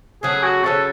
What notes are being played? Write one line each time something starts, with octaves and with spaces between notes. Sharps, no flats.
C#3 F#3 A3 C#4 G#4
F#4
C#3 F#3 A3 C#4 A4